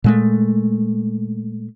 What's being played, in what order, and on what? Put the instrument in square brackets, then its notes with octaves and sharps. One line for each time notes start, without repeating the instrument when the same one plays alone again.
[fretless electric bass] A#2 G#3 A3